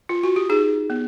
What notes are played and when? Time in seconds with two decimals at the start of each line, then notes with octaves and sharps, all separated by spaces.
0.09 F4
0.23 F#4
0.36 G4
0.50 D#4 G#4
0.90 B3